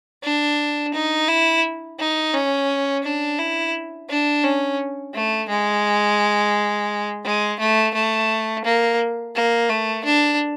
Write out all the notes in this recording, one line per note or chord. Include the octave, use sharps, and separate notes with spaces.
D4
D#4
E4
D#4
C#4
D4
E4
D4
C#4
A3
G#3
G#3
A3
A3
A#3
A#3
A3
D4